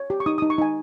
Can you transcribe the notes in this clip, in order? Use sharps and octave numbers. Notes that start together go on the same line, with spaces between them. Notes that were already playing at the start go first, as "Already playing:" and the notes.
Already playing: C#5
G4
C#6
D#4 D#6
D#6
D#4
C#6
D#4 G#5